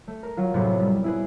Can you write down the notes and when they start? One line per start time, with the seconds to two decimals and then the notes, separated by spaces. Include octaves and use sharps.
0.08 A3
0.23 A#4
0.37 F#3 F4
0.54 F#2 A2 C3 F#3 B3 C6
0.80 G3 B6
1.04 E4 G#4 B4